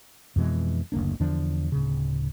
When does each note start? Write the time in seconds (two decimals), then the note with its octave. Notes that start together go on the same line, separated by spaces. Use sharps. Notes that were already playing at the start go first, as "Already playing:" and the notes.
0.36 F2 B2 E3 G#3
0.92 F#1 D2 A#3 D4
1.20 E2 D3 F3 D4
1.72 D1 C#3